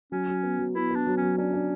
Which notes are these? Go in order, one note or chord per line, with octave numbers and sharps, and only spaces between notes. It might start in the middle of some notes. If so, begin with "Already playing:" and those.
F#3 C#4
F#3
B3
F#3
B3 E4
B3
D4
F#3
F#3 C#4
C#4 D4
D4